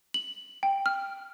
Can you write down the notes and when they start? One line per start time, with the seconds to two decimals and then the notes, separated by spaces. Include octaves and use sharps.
0.14 F#7
0.63 G5
0.86 F6